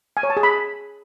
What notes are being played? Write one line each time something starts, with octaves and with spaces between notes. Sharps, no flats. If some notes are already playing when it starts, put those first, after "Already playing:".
G#5
C#5
A5
G#4
B5